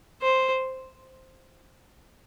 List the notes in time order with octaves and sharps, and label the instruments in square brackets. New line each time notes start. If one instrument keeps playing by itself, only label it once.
[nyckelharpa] C5